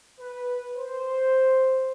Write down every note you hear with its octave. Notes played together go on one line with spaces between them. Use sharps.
B4
C5